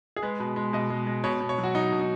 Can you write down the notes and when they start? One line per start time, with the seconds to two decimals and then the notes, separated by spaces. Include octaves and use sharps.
0.16 G#4
0.22 G#3 B4
0.40 B2
0.56 G#3
0.73 B2 D#5
0.90 G#3
1.07 G#3
1.24 B2 C#5
1.41 B2
1.49 C#5
1.58 F#3
1.64 F#4
1.75 F#3 D#4
1.92 B2
2.00 D#4